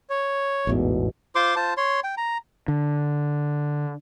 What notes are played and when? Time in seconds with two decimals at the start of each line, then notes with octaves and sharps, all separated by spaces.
0.10 C#5
0.67 A1 E2 G#2 B2
1.35 F4 C5 C6 D6
1.56 F4 C5 A5
1.77 C#5 C6
2.04 G5
2.17 A#5
2.68 D3